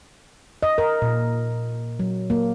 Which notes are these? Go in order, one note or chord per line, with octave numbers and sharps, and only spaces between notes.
D#5
A#4
A#2
F#3
A#3